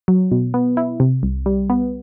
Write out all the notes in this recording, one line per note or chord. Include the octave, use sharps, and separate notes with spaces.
F#3
B2
B3
E4
C3
C2
G3
B3